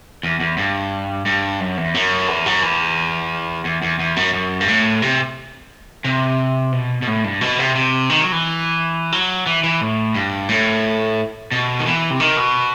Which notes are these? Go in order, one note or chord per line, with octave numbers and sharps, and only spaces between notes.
E2
E2
G2
G2
F#2
E2
F#2
E2
F#2
E2
E2
E2
E2
F#2
F#2
G2
A2
C3
C3
B2
B2
A2
G2
B2
C3
C3
D#3
F#3
E3
F#3
E3
E3
A2
G2
A2
B2
D#3
E3
C3
D#3
B2